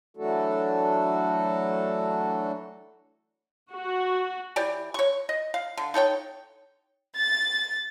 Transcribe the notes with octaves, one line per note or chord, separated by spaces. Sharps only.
E3 F#3 A3 D4 F#4 A4
F#4
E3 G4 D5
C#5 C#6
D#5
F5
D3
D#4 A4 C#5 G5
A6